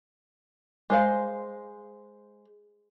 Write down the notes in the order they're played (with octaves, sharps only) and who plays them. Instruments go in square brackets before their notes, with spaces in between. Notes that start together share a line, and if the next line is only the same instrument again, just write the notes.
[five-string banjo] G#3 C5 F5